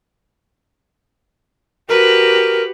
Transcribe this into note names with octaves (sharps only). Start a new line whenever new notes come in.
F#4 G4 A#4 B4